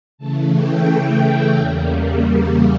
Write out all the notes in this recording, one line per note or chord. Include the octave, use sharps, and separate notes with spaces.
C#3 E3 A3 A5
G5
E2 C#3 G3 A#3